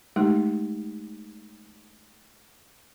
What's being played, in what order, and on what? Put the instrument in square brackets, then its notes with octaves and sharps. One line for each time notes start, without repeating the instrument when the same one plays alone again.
[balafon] G#3 A3 D#4 G4